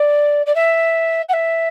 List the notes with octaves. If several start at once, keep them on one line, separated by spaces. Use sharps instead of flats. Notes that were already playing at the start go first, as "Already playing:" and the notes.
Already playing: D5
D5
E5
F#5
E5